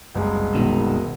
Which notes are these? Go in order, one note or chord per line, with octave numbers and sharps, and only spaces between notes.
F#1 C2 G#3
C#2 B2 D#3